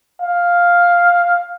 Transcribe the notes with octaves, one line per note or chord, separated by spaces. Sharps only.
F5